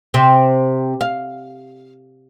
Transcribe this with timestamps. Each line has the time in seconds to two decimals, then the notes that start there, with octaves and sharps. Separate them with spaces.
0.14 C3 C4
1.01 F5